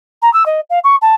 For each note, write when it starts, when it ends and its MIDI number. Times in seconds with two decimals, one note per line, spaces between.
0.22 0.32 82
0.33 0.45 88
0.46 0.60 75
0.70 0.79 77
0.84 0.96 85
1.01 1.15 81